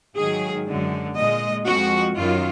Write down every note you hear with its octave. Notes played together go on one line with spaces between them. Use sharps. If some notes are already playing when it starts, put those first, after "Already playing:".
G#2 D#3 F#3 G#4
F#2 D3 G#3
A#2 G#3 D#5
F2 F3 G#3 F#4
F#2 D#3 F#3 F4